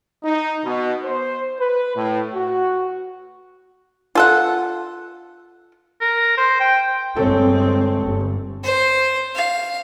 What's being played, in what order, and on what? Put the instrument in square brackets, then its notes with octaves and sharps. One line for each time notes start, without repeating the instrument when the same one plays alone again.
[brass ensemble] D#4
B2
C5
B4
A2
F#4
[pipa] F4 A4 F#5
[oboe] A#4
C5
G5
[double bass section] G1 G#3 C4 [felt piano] A4 C#5
[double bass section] G1
[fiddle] C5
F5